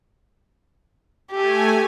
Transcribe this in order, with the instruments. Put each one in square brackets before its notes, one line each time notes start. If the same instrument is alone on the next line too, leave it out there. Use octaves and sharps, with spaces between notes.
[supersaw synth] A3 G#5 [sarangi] G4